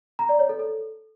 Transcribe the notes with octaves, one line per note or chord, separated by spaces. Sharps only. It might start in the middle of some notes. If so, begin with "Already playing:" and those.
A#5
D5
C#5
A4
A4